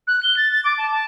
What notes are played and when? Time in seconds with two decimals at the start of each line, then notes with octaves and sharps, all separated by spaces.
0.07 F#6
0.23 G7
0.37 A6
0.52 A6
0.64 D6
0.78 A5
0.91 A5